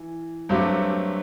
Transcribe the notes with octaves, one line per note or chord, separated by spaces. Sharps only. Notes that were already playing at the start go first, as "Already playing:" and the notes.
Already playing: E3
G2 F#3 A3 C4 G4